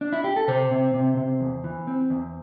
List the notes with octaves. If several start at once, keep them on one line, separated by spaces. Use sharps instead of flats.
D4
E4
G4
A4
C3 C5
C3
C3
C3
E2
E3
C4
E2